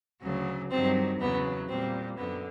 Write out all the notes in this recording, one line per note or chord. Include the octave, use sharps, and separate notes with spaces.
D2 C#3 F#3
G2 D#3 F#3 C4
E2 C#3 F#3 B3
A#2 G3 C4
F#2 D3 B3